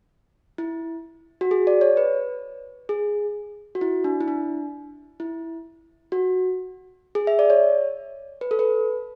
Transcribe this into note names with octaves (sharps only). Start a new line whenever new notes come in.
E4
F#4
G#4
D5
C#5
B4
G#4
F#4
E4
D4
E4
D4
E4
F#4
G#4
E5
D5
C#5
B4
A4
B4